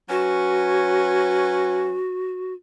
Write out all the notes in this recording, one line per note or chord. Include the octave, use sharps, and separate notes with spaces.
F#3 C#4 F#4 B4